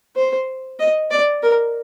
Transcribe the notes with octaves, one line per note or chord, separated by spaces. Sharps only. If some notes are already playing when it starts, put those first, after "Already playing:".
C5
D#5
D5
A#4